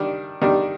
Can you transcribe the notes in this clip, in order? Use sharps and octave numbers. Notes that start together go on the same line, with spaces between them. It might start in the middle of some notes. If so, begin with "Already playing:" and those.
Already playing: D#3 G3 D4
D#3 G3 D4